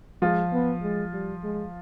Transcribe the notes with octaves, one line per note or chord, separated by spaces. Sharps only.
F3 G#3 F4
B3
G#3
G3
G#3